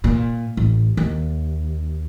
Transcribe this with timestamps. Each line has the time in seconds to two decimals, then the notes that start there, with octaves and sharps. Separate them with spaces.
0.04 A#2
0.57 A1
0.97 D#2